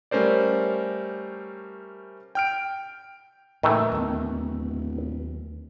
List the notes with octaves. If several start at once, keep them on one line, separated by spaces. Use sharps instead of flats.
G3 A3 C#4 A#4 C5 D5
G5 F6 D7
F#1 A2 D#3 E3 A3
D1 D#2 B3